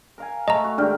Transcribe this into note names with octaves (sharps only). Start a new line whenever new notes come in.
A#4 F5 G#5
A3 D#5 A5 A#5
F#4
G#2 D#3 D4 G4 D5 F6